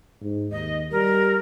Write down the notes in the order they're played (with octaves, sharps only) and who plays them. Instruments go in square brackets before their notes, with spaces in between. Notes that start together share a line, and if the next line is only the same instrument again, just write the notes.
[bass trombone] G#2
[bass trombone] D#2 [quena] D#5
[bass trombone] G3 [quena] A#4